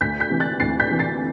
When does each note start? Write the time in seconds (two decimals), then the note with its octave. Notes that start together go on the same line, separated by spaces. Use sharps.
0.01 D2 G6 B6
0.20 G6 B6
0.30 C3 E3
0.40 F#6 A6
0.60 D2 A6 C7
0.80 G6 B6
0.89 C3 E3
0.99 A6 C7